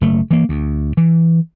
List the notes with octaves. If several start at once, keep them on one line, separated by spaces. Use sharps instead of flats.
F#1 A3
E3 A#3
D2
E3